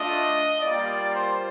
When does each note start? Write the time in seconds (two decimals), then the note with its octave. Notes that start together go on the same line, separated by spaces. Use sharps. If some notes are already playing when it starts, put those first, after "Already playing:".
Already playing: A3 D4 F4 D#5
0.62 G3 A#3 F4 D5
1.14 C5